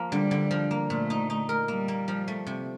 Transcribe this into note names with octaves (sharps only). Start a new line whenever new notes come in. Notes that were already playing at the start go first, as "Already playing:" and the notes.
Already playing: F3 A#3
D3 G3
D3
F3
A#3
A#2 A3
D#4
D#4
A#4
G3 A#3
A#3
F3
A3
C3